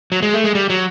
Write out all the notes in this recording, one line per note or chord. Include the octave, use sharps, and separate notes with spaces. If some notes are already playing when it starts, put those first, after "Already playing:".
F#3
G#3
A3
G#3
G3
F#3